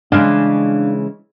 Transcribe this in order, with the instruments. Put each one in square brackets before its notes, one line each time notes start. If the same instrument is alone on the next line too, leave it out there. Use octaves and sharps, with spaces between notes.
[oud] C#3 E3 G#3 [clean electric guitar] D4 F5